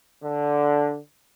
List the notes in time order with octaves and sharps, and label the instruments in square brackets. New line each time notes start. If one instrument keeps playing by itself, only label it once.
[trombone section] D3